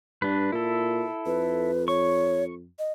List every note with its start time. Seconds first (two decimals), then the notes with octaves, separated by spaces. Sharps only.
0.22 G2 D4 B4
0.52 A#2 E4 A4
1.26 F2 B4
1.88 C#5 C#6
2.79 D#5